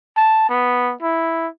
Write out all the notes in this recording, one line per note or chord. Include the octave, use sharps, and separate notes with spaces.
A5
B3
E4